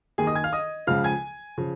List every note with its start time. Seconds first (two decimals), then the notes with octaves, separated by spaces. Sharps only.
0.18 D#2 D#3 G#4 G#5
0.27 D#5 D#6
0.35 G#5 G#6
0.44 F5 F6
0.53 D#5 D#6
0.87 C#2 C#3 F3 F5 F6
1.04 G#5 G#6
1.58 C#3 F3